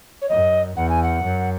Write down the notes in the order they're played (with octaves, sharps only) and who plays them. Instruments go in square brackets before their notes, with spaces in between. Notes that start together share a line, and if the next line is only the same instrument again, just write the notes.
[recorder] C#5
[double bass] F#2 [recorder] D#5
[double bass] E2 [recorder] F#5
[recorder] G#5
F#5
[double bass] F#2